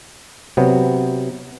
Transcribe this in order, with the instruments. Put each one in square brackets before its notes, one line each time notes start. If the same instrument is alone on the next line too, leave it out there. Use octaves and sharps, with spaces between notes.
[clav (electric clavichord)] C3 F#3 B3